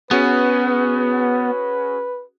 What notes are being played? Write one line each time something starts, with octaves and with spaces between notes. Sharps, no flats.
B3 C#4 F#4 G#4 B4